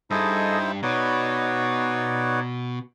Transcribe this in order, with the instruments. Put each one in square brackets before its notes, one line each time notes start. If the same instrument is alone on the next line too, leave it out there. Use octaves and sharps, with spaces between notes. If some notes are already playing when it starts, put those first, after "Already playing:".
[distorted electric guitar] G2 [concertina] D#4 E4 C5 [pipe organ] G#4 A4 D#5
[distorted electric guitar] B2 [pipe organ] D#4 C#5 D5 [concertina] F#4 B4